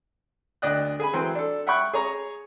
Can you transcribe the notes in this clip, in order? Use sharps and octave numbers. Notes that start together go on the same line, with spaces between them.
D2 D4 D5 D#5 G5 F#6
G#4 G#5 B5
E3 F#3 C4 G5 C6
D4 A4
E5 F#5 G5 B5 C#6 F#6
G#4 C#5 A#5 C#6